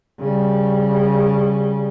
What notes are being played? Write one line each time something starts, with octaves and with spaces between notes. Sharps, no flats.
C#3 G3